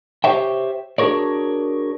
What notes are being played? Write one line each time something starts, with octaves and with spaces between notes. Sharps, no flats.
G4 G#4 C5 C#5 E5 G5
D4 F#4 G#4 A#4 C#5 D5